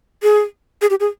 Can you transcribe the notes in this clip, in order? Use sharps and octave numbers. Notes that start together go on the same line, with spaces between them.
G#4
G#4
G4
G#4